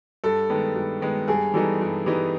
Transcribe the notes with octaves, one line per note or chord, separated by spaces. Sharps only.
G2 A4
D#3 G#3 B3
G2
D#3 G#3 B3
G2 G#4
E3 G3 B3 D#4 A4
G2
E3 G3 B3 D#4